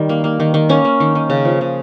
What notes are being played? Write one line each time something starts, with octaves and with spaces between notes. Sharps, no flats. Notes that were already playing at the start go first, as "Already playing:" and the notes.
Already playing: D#3 G3
A#3
A#3
D#3
D#3
A#3 C#4
A#3
D#3
D#3
C#3
F3
C#3